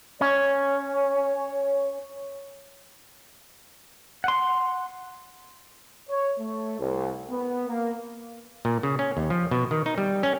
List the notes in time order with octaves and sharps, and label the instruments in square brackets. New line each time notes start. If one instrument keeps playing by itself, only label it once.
[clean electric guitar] C#4 [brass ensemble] C#5
[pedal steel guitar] F#5 C6
[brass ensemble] C#5
A3
C2
B3
A#3
[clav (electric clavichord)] A#2
C#3
C#4
D#2
F3
B2
D#3
D#4
G3
C#4